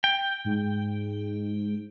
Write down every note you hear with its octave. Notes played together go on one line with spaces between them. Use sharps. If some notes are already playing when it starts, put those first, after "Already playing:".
G5
G#2